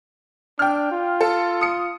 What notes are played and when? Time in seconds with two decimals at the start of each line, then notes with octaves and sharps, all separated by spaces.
0.59 D4 G5 F6
0.91 F4
1.21 A4
1.61 D#6 C#7